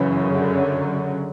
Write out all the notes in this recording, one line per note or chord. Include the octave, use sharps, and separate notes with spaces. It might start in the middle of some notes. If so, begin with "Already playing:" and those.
Already playing: F#2 C#3 E3
D3 F#3